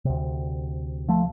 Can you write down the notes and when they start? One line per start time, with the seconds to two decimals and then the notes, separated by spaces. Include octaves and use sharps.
0.05 D2 C3
1.09 F3 A3